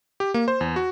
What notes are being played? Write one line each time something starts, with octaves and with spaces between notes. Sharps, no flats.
G4
A#3
C5
E2
F#4